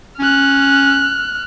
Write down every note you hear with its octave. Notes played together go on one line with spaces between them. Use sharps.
C#4 F6 F#6